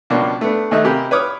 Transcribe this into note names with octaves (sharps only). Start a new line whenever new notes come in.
C#2 B2 F3 A#3 D4 D5
A3 B3 D4
D#2 A3 D#4 D#5 E5 F#6
C3 A#3 G4 A#4 G#5 B5
B4 C#5 D6 D#6 F6